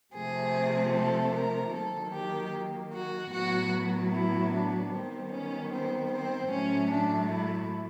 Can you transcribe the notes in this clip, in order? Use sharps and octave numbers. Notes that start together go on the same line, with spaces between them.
C3 F3 A3 C4 G#4
A4
A#4
D#3 F#3 A#3 A4
G4
F#4
A2 F#3 B3 F#4
E4
D4
D#3 G3 B3 C4
C#4
C4
C4
A2 F#3 A3 C#4
D4
E4